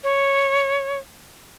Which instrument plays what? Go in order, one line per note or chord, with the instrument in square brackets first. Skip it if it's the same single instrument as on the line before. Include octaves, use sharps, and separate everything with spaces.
[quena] C#5